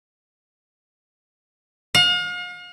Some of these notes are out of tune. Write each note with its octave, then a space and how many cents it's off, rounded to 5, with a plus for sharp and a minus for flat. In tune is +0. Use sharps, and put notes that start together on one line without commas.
F5 +40